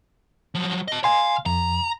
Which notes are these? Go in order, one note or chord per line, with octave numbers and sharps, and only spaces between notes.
F3 F#3
D#5 A5
F5 G#5 C6
F2 A#5